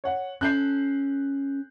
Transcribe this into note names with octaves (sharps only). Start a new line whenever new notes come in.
C#5 F#5
C#4 A4 F#6 G6 C7